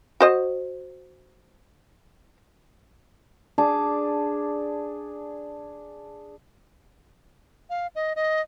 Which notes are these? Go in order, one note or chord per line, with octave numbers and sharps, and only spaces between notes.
F#4 C5 D#5
D4 G#4 A5 D6
F5
D#5
D#5